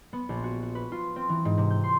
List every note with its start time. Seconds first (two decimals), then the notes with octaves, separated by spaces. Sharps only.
0.13 B3
0.29 A#1
0.44 F#4
0.63 F#4
0.75 B4
0.92 F4
1.16 C4
1.29 E3
1.45 G#2
1.58 C3
1.70 G6
1.84 C6